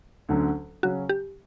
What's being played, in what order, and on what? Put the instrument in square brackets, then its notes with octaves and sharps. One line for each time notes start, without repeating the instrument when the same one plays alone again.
[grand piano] D2 D3 F#3 C#4
[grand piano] C#3 F#3 C#4 [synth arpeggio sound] F#4
[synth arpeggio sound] G4